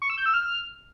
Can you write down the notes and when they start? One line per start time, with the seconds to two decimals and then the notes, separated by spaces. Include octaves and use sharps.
0.02 C#6
0.10 E6
0.18 G6
0.26 E6
0.34 F6